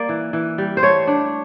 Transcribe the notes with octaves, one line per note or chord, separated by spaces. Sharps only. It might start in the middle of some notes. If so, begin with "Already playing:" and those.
Already playing: A#3 D5
E3
E3
G3
C5
A3 C#5
D4